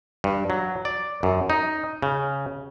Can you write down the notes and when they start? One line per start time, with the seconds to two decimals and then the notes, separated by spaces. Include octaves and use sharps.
0.24 G2
0.50 F#3
0.85 D5
1.23 F#2
1.50 D#4
2.02 C#3